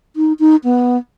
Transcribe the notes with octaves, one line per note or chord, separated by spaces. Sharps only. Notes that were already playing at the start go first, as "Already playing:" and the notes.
D#4
D#4
B3